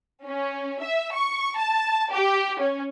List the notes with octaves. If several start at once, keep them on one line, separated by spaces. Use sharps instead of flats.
C#4
E5
C#6
A5
G4
C#4